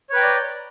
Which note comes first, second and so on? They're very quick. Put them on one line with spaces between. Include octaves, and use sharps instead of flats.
C#5 B4 G5 A#5 D5